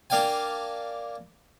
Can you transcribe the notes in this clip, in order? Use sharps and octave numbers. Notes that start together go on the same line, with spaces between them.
A#3 D4 F5 G5 G#5